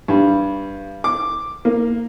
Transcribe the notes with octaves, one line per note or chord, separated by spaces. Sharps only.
G2
D6
A#3